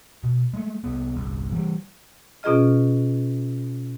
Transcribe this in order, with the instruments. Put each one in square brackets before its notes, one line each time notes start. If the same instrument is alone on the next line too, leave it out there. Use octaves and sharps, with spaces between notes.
[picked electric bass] B2
G#3 A3
C2 B3
G1 C2
E3 G3
[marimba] B2 C#4 F4 G#4 D#5 F6